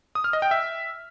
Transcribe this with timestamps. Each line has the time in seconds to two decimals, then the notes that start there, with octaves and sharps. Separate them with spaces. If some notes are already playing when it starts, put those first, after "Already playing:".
0.15 D#6
0.24 F6
0.33 D#5
0.42 G5
0.51 E5